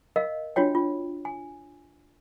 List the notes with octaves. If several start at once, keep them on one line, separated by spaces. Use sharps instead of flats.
A#4 D#5 F5
D4 F4 F#4 C#5 G5
F4
G#5